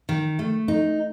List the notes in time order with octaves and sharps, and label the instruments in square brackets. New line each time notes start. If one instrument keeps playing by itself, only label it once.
[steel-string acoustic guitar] D#3
A3
D#4